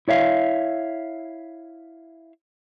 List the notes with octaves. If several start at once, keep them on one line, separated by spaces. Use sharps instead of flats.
E4 C#5 E5 F5